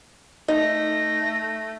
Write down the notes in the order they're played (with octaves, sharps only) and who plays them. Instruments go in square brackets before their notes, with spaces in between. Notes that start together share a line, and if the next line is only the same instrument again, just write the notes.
[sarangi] A3 [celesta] D#4 [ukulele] D#5 [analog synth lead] A#6